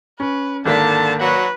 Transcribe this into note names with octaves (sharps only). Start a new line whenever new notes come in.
C#4 B4
G#1 D3 A#3 A5 B6
F#3 F#4 B4